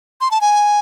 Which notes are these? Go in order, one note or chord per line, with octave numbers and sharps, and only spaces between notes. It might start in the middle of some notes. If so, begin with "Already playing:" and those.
C6
A5
G#5